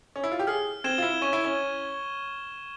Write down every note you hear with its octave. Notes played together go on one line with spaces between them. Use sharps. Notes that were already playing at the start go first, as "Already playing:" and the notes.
C#4
E4
F4
G4
G#4 F6
C4 G#6 E7 G7
F4
E4
C#4 C#6
E4
C#4